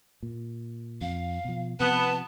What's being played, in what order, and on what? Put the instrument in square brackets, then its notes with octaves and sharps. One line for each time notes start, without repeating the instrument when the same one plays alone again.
[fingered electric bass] A#2
[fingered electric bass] F2 [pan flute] F5
[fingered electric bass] B2 F3
[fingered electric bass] C3 F3 [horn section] B3 [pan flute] A5